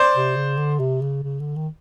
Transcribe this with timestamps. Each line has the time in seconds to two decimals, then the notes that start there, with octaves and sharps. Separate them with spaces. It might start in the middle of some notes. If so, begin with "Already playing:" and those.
Already playing: C5 D5
0.14 C3
0.36 C#3
0.57 D3
0.79 C3
1.01 C#3
1.23 C#3
1.40 D3
1.56 D#3